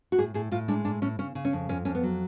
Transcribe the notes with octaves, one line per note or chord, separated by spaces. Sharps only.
F#4
A2 G#4
A2 G#4
A2 F4
G#3 D4
A2 D4
A2 C#4
C#3 C#4
C#3
C#4
F2
F2 C#4
F2 C#4
B3
F#3